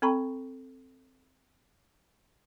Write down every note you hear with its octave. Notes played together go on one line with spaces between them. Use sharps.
C4 A4 G5 A#5 B5 C#6